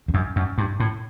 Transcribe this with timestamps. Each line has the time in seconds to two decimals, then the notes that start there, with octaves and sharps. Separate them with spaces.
0.08 E2
0.14 F#2
0.36 F#2
0.58 G2
0.80 A2